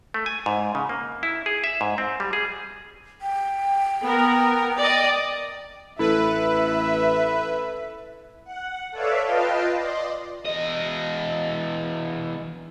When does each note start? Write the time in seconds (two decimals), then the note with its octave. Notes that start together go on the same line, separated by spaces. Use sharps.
0.14 A3
0.26 G#5
0.46 G#2
0.75 C#3
0.89 A#3
1.23 E4
1.46 G#4
1.64 E5
1.81 G#2
1.98 C4
2.20 G3
2.33 G#4
3.22 G5
4.03 B3 A#4
4.78 D5 D#5
5.99 A1 E4 A4 B4 E5
8.44 F#5
8.91 A4 B4 C#5 D5 E5 F5
9.22 F4 B4 D#5 F5 G5 A5
9.76 D5 D#5 C6
10.45 E2 D#5